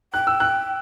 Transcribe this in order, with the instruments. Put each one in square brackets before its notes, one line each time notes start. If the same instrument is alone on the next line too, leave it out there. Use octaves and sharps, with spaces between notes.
[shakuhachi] G5 [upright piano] F#6
[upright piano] E6
F#6